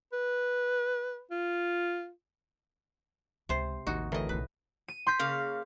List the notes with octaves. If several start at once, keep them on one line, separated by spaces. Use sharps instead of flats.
B4
F4
C#2 C3 C5
A1 D#2 D#4 F#4
D2 A2 E3 A#4 D#5
B1 B3 B4
D#7
C6 G6 B6
C#3 A#3 F5